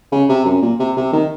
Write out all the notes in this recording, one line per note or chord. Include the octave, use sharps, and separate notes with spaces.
C#3
C3
F#2
A#2
C3
C3
D#3